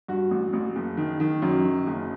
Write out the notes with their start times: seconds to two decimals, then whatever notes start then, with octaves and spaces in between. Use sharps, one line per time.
0.08 G2 F#4
0.31 A1
0.53 A1
0.76 F#1
0.97 D#3
1.20 D#3
1.42 F#2
1.64 D#3
1.87 F#1